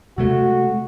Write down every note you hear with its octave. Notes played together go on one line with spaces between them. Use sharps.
C3 G#3 A3 F#4